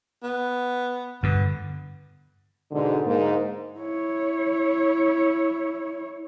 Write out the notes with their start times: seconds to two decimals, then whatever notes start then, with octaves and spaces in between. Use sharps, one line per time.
0.23 B3
1.23 G2 D3 B3
2.72 G#2 B2 D3
3.05 G#2 A#3
3.79 E4 C#5